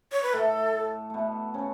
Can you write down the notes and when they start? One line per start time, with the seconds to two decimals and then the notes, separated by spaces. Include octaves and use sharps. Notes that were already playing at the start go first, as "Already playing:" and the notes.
0.12 C#5
0.23 B4
0.33 A2 A3 A4
1.10 B2 A3 B3
1.54 C#3 C#4